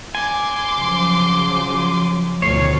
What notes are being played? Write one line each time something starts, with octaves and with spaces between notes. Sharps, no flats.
G#5 C6 D6
C#3 F3 F#3
D2 B2 D#3 F4 C#5 C7